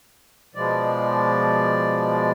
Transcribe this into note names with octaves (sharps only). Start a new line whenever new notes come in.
B2 F3 G#3 D5